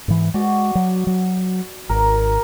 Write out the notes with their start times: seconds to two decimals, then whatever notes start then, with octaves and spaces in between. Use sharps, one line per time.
0.08 G#2 E3
0.34 G#3 F#4 D5
0.75 F#3
1.07 F#3
1.89 G#1 A#4